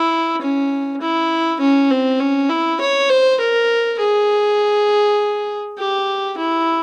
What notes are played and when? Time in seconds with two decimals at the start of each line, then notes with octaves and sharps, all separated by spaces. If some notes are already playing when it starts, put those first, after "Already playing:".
Already playing: E4
0.42 C#4
1.01 E4
1.61 C#4
1.91 C4
2.20 C#4
2.50 E4
2.81 C#5
3.10 C5
3.40 A#4
3.99 G#4
5.78 G4
6.38 E4